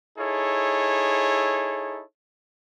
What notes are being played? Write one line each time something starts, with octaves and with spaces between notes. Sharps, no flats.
D#4 E4 G#4 A4 C#5